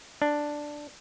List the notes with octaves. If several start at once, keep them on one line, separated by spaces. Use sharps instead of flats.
D4